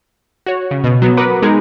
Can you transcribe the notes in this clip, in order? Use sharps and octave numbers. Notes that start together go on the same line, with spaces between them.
F#4 C#5
C#3
B2
F#3 B3
A#4 B4 F#5 B5 D6 D#6
G#3 B3 D#4 G#4 A#4